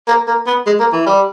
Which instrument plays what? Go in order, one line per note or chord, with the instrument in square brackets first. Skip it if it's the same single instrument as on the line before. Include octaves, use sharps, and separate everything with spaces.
[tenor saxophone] A#3
A#3
B3
G#3
A#3
E3
G3